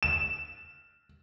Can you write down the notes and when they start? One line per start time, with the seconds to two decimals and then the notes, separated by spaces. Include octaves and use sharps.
0.03 E7